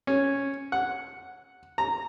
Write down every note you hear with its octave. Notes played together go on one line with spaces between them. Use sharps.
C#4
F#5
A#5